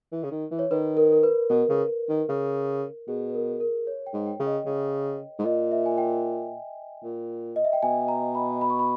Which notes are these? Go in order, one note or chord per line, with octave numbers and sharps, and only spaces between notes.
E3
C#3
D#3
E3
C#5
D#3 B4
A#4
A#4
B4
B2 A#4
C#3
D#3
C#3
B2 G#4
B4
A#4
B4
A#4
C#5
G5
G#2
G5
C#3
D#5
C#3
G#2
A#2 D#5
E5
G#5
G5
A#2
D#5
E5
G5
B2 G#5
A#5
B5
B5
C#6
B5